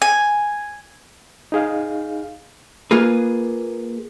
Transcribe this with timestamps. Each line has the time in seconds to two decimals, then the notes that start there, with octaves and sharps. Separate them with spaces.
0.02 G#5
1.52 D#4 G#4 F5
2.91 A#3 F4 G#4 B4